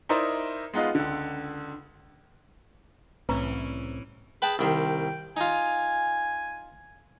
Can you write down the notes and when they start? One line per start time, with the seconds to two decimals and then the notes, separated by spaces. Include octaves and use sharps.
0.09 D#4 E4 A#4 C5 D5
0.74 G#3 B3 D#4 F4 D#5
0.95 C#2 D3
3.29 C2 A2 E3 C4 C#4 E4 B4 A#5
4.42 G#4 B4 G5 A5
4.59 C2 D#3 G5 C6
5.37 D#4 F4 G#5